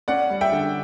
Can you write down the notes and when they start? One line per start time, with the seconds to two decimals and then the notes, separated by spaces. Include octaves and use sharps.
0.08 C#4 D5 F#5
0.30 G3
0.41 E5 G5
0.52 D3